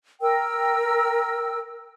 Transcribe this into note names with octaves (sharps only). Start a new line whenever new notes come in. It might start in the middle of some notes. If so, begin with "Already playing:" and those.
A#4 G5 E6